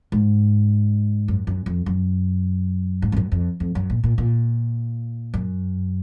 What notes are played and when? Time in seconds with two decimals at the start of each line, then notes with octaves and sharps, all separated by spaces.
0.12 G#2
1.28 F#2
1.47 F#2
1.66 F2
1.86 F#2
3.02 G#2
3.12 F2
3.17 F#2
3.32 F2
3.60 F2
3.75 F#2
3.90 A#2
4.04 A#2
4.18 A#2
5.34 F#2